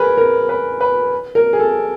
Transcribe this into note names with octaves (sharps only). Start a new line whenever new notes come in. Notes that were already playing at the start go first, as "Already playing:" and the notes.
Already playing: G#4 A#4 B4
A#4
B4
B4
A#4
G#4
A4